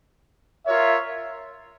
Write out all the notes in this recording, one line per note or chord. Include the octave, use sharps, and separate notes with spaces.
F4 A#4 C#5 E5